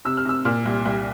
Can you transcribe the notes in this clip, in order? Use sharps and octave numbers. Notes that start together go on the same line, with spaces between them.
C3 E6
F6
C3 E6
A#2 F6
C2
C2